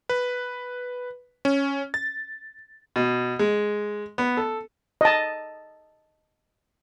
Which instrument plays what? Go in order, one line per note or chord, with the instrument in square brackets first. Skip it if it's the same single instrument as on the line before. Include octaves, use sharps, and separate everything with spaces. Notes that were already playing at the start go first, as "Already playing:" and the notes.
[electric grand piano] B4
C#4
A6
[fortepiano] B2
G#3
B3
A4
[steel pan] D#5 A5